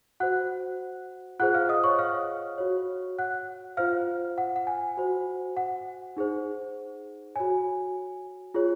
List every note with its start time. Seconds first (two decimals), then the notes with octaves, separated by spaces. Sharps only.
0.20 F#4 C5 F#5 F#6
1.39 F4 G#4 C5 F#5 F#6
1.54 F5 F6
1.69 D#5 D#6
1.84 C#5 C#6
1.99 F5 F6
2.58 F#4 C#5
3.19 F#5 F#6
3.77 F4 C5 F5 F6
4.38 F#5
4.56 F#5
4.67 G#5
4.97 F#4 C5
5.57 F#5
6.17 D#4 G#4 C5
7.36 F#4 C#5 G#5
8.54 F4 G#4 C#5